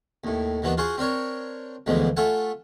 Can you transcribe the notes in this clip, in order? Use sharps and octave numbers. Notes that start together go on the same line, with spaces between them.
D#2 A2
D#2 D#3 E3 B3 D4
F4 F#4 G#4 C5 F#5
C4 D4 A#4 C#5
D2 B2 E3 F3 G#3
A3 F4 A4 F#5 G#5